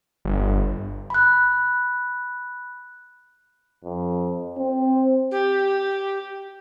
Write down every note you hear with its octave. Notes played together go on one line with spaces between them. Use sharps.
G1
B5 F#6
F2
C4
G4